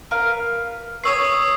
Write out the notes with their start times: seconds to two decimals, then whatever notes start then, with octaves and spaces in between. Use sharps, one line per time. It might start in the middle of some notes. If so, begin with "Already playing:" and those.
0.11 A#4 B4 F5
1.04 B4 C#5 G#5 D#6 E6 C7